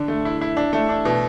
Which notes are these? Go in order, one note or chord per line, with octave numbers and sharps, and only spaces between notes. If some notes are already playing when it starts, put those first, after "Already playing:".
Already playing: D3 D4
A3
E4
E4
D4
A3
D4
B2